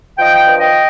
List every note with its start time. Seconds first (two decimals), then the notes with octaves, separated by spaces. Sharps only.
0.19 F3 D#5 G5
0.46 G2
0.59 D#5 G5